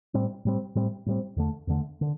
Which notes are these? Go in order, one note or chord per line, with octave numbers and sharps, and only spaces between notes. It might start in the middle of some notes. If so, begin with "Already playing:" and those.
A2 G3 C4
A2 G3 C4
A2 G3 C4
A2 G3 C4
E2 D3 A3
E2 D3 A3
D3